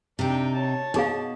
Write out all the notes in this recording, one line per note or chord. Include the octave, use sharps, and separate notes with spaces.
C3 D4 D#4 G5
C#5 A5
B2 D#4 G#4 F5